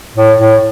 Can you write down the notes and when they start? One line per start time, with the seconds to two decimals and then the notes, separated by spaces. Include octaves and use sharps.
0.16 A2
0.39 A2